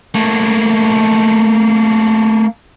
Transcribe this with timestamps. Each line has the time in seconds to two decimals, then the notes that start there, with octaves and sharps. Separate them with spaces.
0.15 A3 A#3